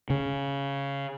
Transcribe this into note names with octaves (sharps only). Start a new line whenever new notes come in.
C#3